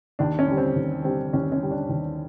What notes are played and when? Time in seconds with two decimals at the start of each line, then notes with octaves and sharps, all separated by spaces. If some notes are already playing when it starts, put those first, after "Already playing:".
0.19 D#2 D4
0.39 C#4
0.48 D3 G3
0.57 C4
0.76 D#2
1.04 D3 G3 C4
1.33 D#2 C#4
1.52 C#4
1.62 D3 G3
1.71 D4
1.89 D#2